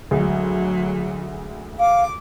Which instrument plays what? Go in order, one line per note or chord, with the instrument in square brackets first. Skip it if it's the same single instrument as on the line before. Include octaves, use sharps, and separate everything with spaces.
[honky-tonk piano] D2 G#3 [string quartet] F#3
[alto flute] F5 [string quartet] D6